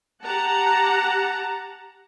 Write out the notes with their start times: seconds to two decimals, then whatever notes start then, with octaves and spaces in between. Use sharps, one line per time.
0.24 G4 F#5 A5 A#5